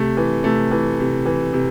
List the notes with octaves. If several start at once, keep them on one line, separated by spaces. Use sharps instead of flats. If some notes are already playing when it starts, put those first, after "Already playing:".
Already playing: C3 A3
E3
C3 A3
E3
C3
E3
C3